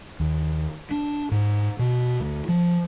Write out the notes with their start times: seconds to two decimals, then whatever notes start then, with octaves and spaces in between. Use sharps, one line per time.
0.20 D#2
0.91 D4
1.31 G#2
1.79 B2
2.20 D2
2.48 F3